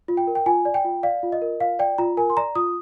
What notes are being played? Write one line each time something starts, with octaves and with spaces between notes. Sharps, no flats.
F4
G5
A#4
G5
F4 G#5
D5
G5
F4
D5 F5
F4
D#5
A#4
F4 F5
D5 G5
F4 A#5
A#4 G#5
C6
D5 A#5
F4 D#6